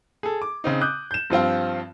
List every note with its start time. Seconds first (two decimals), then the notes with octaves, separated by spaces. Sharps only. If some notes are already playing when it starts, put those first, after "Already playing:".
0.23 G#4 A4
0.42 D6
0.64 C#3 C4 D#4
0.81 D6 D#6 F#6 G6
1.11 G6 E7
1.30 G2 F3 C4 F4